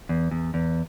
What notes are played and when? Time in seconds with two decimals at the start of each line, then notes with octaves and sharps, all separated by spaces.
0.09 E2
0.31 E2
0.54 E2